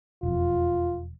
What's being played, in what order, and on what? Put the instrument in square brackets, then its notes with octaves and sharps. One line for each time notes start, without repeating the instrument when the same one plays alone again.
[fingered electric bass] E1 F2 [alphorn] F4